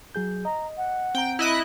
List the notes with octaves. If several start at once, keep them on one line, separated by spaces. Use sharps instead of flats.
F#3 G#4 G6
D#5 A#5
F#5
C4 G5 A#5
E4 D#5 F#6